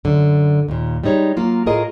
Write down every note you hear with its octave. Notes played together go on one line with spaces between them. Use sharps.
F#2 D3
D#2 A#2
G3 G#3 D#4 C#5
F#3 A#3 F4
A2 F4 G#4 A#4 D#5